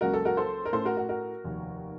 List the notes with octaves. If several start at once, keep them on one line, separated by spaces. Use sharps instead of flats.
C#2 C#3 F#3 A#3 C#4 F#4 A#4
A4
F#4 A#4
A4 C5
A#4
A2 A3 C#4 A4 C5
F#4 A#4
F#4
F#4 A#4
F1 D#2 D#3